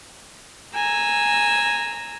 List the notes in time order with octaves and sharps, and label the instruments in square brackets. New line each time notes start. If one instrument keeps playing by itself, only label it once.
[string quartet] G#5 A#5 E6